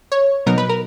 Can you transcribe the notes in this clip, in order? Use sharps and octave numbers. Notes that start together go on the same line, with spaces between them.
C#5
B2 F#3 B3 D#4 A#4
B4
A#4